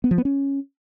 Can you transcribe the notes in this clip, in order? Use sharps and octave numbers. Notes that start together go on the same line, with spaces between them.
B3
F3
B3
C#4